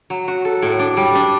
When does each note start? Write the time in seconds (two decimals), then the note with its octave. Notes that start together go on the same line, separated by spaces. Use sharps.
0.10 F#3
0.28 F#4
0.45 A4
0.62 A2
0.79 D4
0.97 G3
1.15 D4